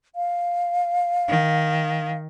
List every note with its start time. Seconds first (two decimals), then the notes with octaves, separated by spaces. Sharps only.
0.16 F5
1.28 D#3